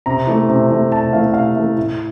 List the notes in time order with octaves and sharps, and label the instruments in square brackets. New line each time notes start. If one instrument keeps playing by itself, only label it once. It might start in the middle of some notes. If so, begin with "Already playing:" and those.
[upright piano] C3 A#5
E3 A3
C3
E3 A3
C3 A5
E3 A3 F5
C3 F5
E3 A3
A2